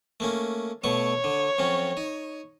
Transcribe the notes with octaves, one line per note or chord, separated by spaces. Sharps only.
A3 A#3 C#4
B2 A3 C#5 C#6
D3
F2 F#3 C#4
D#4